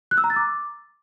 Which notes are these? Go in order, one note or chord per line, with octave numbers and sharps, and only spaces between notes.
F#6
E6
A#5
A6
D6